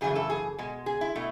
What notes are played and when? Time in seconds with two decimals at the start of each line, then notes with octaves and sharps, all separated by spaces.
0.01 F#2 C#3 E3 A3 G#4
0.15 A4
0.30 G#4
0.58 B2 G#3
0.86 G#4
1.01 E4
1.15 B2 A3